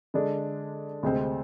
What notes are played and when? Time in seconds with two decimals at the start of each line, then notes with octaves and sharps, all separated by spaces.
0.14 D3 G#3 D4
1.03 D2 C3 G#3 C4